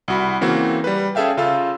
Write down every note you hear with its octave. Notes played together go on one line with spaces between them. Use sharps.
C2 F#4 B5
C#3 E3 A#3 C4 F#4
G3 B4
C#4 G#4 A4 E5 F5 G5
C#3 F4 A4 F5 E6